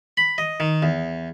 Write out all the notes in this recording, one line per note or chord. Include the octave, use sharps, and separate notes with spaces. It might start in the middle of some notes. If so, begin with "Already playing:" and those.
B5
D#5
D#3
E2